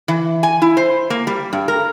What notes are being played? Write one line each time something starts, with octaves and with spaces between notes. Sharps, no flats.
E3
G#5
E4
C5
A#3
G3
G2
A#4